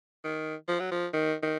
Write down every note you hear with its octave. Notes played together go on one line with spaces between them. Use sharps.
D#3
F3
F#3
F3
D#3
D#3